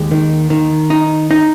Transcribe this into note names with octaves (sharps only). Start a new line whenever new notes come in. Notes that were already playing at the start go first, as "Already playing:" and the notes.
Already playing: D#2 G#3
D#3
D#3
D#4
D#4